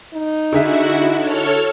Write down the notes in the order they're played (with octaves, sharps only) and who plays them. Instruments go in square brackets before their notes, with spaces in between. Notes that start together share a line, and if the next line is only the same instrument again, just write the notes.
[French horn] D#4
[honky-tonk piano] D3 G#4 E5 [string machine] E4 F#4
[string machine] A4 C#5 F6